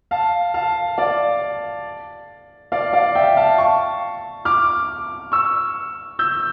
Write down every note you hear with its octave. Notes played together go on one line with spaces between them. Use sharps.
F5 A5
F5 A5
D5 F5
D5 F5
D5 F5
E5 G5
F5 A5
A5 C#6
D6 F6
C#6 E6
E6 G6